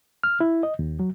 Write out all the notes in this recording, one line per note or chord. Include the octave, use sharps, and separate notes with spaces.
F6
E4
D#5
D#2
F#3